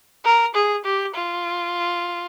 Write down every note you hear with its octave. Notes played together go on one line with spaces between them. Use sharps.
A#4
G#4
G4
F4